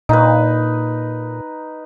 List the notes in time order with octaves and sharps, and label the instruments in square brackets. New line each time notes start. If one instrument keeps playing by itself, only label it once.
[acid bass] A#2 [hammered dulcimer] D#4 B4